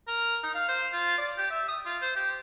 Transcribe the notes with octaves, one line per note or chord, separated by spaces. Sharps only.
A#4
D#4
F5
C5
F4
D5
G4
E5
D#6
F4
C5
G4